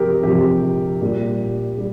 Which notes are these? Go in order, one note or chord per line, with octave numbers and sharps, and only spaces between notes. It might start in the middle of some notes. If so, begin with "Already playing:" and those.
Already playing: C3 F3 G4 A#4
C3 F3 G4
A#2 G3
G3